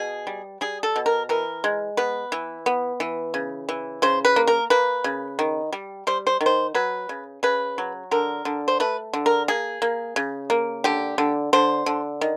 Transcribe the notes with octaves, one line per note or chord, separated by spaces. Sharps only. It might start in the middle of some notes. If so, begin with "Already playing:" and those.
Already playing: B2 G#4
G3
G3 G#4
A4
B2
A#4
E3 A#4
G#3
B3 B4
E3
B3
E3
C#3
E3
C#3 C5
B4
A#3
A#4
A#3 B4
C#3
D#3
G3
G3 C5
C5
D#3
C5
F#3 B4
C#3
C#3 B4
F#3
D3 A#4
D3
C5
A3 B4
D3
A#4
A#3 G#4
A#3
C#3
A#3
D3 G4
D3
D3 C5
D3
D#3